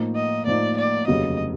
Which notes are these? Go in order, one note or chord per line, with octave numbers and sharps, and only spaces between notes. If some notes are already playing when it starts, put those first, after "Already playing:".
Already playing: A2 F3 A#3 D#4
D#5
A2 F3 A#3 D#4 D5
D5
F1 D#2 C#3 F#3 B3 D#5